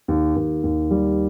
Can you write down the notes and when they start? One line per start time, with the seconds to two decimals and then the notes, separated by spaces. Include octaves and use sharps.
0.08 D#2
0.36 D#2
0.63 D#2
0.91 G3